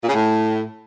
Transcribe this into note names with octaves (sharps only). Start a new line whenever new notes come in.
A#2
C#3
A2